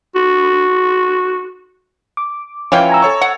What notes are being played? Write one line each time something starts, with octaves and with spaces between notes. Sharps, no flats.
F#4
D6
E3 F3 C#4 C#5 F5 G5
G#5 A#5 E6
A4 C#5 C#6
F#5